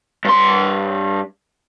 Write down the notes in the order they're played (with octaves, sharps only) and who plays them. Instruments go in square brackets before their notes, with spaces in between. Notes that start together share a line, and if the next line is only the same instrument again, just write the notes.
[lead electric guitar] G2 C6